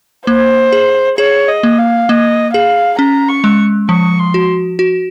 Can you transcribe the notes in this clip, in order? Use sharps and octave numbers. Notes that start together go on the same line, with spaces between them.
A#3 C5
G#4
G#4 C#5
D#5
A#3
F5
A#3 D#5
G#4 F5
C#4 A#5
C#6
G#3
F3 C#6
C6
F#4
F#4